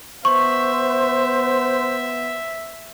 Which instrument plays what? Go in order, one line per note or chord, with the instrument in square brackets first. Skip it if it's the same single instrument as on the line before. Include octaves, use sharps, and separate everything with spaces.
[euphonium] B3 [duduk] C5 [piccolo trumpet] E5 [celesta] C#6